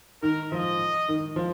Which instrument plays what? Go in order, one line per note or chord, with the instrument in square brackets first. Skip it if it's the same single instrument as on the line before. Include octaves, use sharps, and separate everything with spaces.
[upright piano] D#3 [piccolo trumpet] A#4
[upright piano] F3 [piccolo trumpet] D#5
[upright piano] D#3
F3